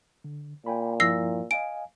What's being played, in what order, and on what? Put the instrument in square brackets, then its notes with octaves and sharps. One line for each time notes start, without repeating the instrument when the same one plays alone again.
[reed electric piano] D3
[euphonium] A#2 [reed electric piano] G5 G#5 B5
[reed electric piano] G2 F3 E4 [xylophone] E6 A#6 C7
[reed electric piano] D#5 F5 G#5 [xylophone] D7